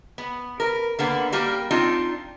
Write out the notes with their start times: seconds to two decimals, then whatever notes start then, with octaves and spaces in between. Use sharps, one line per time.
0.18 B3
0.60 A#4 B4
0.99 D3 A#3 B3
1.32 G3 A#3 G4 A#4
1.71 C4 D4 D#4 F4